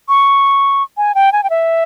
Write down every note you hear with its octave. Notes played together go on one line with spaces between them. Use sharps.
C#6
G#5
G5
G#5
G5
E5